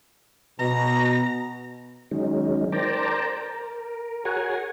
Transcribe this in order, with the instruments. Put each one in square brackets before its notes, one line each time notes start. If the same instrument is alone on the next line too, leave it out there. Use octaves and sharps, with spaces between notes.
[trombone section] B2 [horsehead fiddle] A#5
[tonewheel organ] D#3 F#3 G#3 C#4 D#4
A#4 C5 D5 G5 A5 A#5
A#4
F#4 G#4 A#4 C#5 F#5 G#5